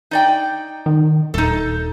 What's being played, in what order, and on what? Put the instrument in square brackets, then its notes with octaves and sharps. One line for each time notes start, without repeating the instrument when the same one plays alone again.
[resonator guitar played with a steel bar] D#4 D5 G5
[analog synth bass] D#3
[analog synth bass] D#1 [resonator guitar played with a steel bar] D#4 A4